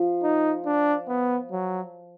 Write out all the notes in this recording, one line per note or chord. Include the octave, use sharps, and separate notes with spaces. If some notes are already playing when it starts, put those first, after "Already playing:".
Already playing: F3
D#4
D4
B3
F#3